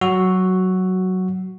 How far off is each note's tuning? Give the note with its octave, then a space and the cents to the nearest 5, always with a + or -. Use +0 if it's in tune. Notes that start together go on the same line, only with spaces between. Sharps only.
F#3 +10 F#4 +0 E6 +0